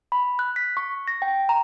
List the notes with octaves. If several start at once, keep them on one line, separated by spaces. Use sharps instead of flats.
B5
F#6
B6
C#6
A#6
G5
A#5